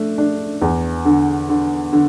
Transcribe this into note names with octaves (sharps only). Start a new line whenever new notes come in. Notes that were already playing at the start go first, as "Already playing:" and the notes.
Already playing: A3 D4
D4
E2
D3
D3
D3